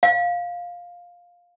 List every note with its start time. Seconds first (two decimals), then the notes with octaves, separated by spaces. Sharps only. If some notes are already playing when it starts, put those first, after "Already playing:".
0.03 F5